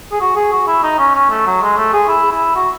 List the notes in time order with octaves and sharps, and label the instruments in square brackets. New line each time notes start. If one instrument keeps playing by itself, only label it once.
[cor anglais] G#4
F#4
G#4
F#4
E4
D#4
C#4
C#4
A3
F#3
G#3
A3
G#4
E4
E4
F#4